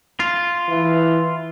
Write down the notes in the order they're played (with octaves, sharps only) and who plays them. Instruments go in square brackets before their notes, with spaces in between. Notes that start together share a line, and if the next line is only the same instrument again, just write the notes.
[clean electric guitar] F4
[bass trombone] E3